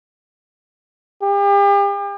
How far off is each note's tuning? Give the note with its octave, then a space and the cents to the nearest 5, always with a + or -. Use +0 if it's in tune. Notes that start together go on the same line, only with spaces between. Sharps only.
G4 +40